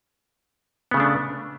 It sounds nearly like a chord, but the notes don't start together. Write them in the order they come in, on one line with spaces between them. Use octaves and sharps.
B3 C#3 A3 D4